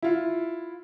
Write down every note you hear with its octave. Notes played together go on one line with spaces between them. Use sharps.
E4 F4